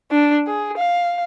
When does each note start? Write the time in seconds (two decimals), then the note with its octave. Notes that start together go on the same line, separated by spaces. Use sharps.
0.11 D4
0.47 G#4
0.77 F5